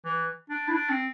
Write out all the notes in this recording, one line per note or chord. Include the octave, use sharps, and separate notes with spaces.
E3
D4
E4
D4
C4